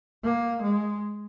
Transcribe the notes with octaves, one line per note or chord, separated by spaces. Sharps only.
A#3
G#3